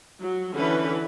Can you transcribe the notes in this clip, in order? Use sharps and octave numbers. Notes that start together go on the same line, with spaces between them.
F#3
D3 E3 C#4 B4